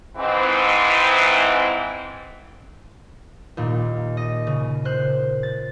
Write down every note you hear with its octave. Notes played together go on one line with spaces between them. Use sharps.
G#2 E3 C4
D#2 A#2
D#5
C#3
C5 F#6
A6